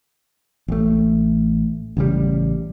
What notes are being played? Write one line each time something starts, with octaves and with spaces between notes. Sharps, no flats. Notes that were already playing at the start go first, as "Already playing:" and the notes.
A1 A3
A1 C#3 F3 G3